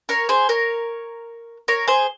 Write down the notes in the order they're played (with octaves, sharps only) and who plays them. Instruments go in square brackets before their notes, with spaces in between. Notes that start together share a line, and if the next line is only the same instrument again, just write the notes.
[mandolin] A#4 C#5
G#4 C5
A#4 C#5
A#4 C#5
G#4 C5